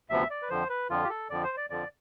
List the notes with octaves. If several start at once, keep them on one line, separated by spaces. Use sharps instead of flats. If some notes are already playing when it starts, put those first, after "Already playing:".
D2 C3 F3 B3 E5
D5
B4
F2 D3 F3 C5
B4
F2 D3 F3 F4
G4
A4
F2 D3 F3 D5
C5
D5
F2 D3 F3 D5